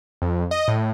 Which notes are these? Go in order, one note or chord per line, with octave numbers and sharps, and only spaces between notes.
F2
D#5
A2